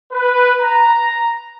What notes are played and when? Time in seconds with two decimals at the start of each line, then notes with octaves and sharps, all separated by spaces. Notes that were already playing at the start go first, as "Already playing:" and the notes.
0.12 B4
0.60 A#5